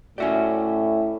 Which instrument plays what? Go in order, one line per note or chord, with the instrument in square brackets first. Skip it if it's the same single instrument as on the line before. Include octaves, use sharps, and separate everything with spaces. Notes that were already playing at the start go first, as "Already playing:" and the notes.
[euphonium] A2 [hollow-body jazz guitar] C#4 F#4 G4 [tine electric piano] D5 E5 G#5